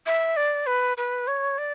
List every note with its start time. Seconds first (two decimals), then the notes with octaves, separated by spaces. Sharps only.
0.06 E5
0.36 D5
0.66 B4
0.97 B4
1.27 C#5
1.58 D5